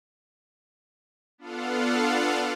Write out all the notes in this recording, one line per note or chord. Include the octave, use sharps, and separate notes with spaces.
B3 D4 F4 A4 F5 F#5